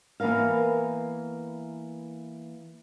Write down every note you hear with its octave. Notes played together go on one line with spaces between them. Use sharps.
E3 A#3 B3 A#4 F5